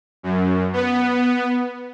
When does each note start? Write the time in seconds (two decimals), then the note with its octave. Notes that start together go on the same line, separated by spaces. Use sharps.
0.23 F#2
0.73 B3